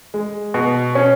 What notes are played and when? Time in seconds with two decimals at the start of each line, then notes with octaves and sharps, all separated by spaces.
0.14 G#3
0.54 B2
0.95 C#4